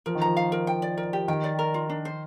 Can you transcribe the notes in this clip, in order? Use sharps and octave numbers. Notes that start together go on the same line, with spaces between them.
F3 A#4
D#3
F3 A#5
F5
A#4
G5
D5
A#4
G4
D#3 G5
D5
A#4
F4
D4
C5